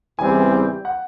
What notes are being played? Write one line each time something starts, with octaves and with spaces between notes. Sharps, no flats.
E2 C#3 E3 G3 C4 G#5
G5
F#5